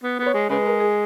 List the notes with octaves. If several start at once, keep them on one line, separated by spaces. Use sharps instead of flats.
B3
B3 B4
C#5
G#3
C#3 G#3 B4
B4
A#4
G#4